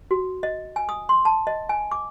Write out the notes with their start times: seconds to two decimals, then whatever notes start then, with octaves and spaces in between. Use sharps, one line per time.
0.11 F#4
0.43 D#5
0.76 G#5
0.89 D#6
1.09 C6
1.25 A5
1.47 D#5
1.69 G#5
1.91 D6